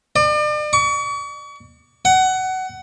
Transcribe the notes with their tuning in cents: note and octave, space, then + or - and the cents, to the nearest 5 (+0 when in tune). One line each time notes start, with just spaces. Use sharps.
D5 +40
C#6 +40
F#5 +20